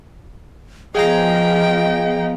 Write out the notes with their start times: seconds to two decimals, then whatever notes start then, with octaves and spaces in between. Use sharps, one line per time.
0.95 F3 B3 G#4 D#5 F5 G5 A#5